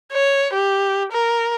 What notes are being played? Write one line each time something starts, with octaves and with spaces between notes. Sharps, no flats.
C#5
G4
A#4